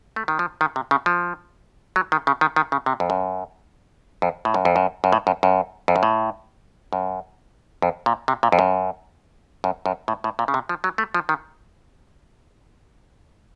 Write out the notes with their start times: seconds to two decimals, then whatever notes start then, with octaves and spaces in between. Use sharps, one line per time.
0.16 A3
0.28 D#3
0.39 F3
0.61 D#3
0.76 C3
0.91 C#3
1.06 F3
1.96 F#3
2.12 D#3
2.27 C#3
2.41 D#3
2.56 D#3
2.72 C#3
2.86 C3
3.00 F2
3.10 F#2
4.22 F2
4.45 A2
4.54 F#2
4.65 F2
4.76 F#2
5.04 F#2
5.12 A2
5.27 F#2
5.43 F#2
5.88 F2
5.96 F#2
6.03 A2
6.93 F#2
7.82 F2
8.06 A#2
8.28 C3
8.43 A#2
8.52 F2
8.59 F#2
9.64 F#2
9.86 F#2
10.08 A2
10.24 A2
10.39 A#2
10.48 C#3
10.54 C3
10.69 F3
10.84 F#3
10.98 A3
11.14 F3
11.29 D#3